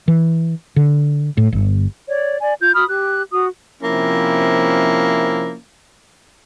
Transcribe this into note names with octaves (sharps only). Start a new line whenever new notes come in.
E3
D3
A2
G1
C#5 D5
D5 G#5
F4 G6
F#4 B5 D#6 F6
G4 F#6
F#4 D#6
C3 F3 A#3 C#4 E4